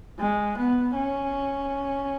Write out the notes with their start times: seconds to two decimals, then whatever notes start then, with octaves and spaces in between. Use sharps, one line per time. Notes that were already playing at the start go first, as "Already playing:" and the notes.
0.19 G#3
0.57 B3
0.95 C#4